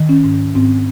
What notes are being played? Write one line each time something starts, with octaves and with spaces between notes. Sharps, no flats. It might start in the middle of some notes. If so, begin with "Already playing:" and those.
Already playing: D#3
C#4
G#2
G#2 C4